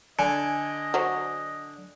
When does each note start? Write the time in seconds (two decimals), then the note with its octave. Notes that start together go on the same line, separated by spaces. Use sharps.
0.19 D3 D#5 G#5
0.94 F#3 C5 C#5